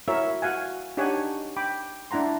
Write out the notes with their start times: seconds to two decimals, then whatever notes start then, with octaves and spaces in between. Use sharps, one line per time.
0.08 E4 F#4 A#4 C#5 E5
0.42 F#4 F5 F#5 G#5
0.97 D4 D#4 G4 C#5 F#5 G#5
1.56 G5 B5 D6
2.11 D4 E4 F#5 A#5 C6